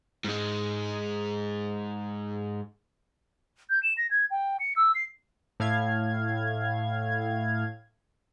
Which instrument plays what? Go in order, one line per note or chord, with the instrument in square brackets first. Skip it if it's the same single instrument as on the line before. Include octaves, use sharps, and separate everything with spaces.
[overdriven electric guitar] G#2 G#3
[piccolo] G6
E7
A#6
G#6
G5
C#7
E6
C7
[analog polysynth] A2 F5 G#6